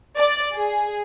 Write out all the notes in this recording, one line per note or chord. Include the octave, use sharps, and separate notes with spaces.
D5
G#4